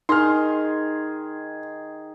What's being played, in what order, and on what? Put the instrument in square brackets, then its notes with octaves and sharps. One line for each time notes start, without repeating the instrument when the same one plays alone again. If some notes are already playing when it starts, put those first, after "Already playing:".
[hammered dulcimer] D#3 G#4 [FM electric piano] D#4 [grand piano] C6 F6